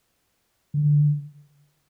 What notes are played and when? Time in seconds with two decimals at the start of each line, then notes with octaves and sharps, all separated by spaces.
0.74 D3